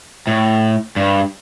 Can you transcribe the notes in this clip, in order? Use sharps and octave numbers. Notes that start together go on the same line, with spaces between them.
A2
G2